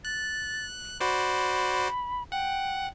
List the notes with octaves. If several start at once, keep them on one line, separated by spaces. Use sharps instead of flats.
F#6 A6
F#4 C5 D5 B5
F#5 G5